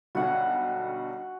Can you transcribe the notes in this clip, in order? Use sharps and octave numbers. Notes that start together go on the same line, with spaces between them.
B1 D3 G3 F#4 F#5 G#5